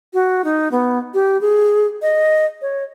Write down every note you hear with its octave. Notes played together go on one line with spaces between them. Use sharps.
F#4
D#4
B3
G4
G#4
D#5
C#5